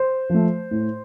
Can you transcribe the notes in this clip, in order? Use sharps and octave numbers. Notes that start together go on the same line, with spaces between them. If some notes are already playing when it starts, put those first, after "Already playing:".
Already playing: C5
F3 A3
A2